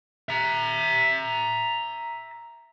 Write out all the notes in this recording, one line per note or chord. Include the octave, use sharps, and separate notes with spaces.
E5 A#5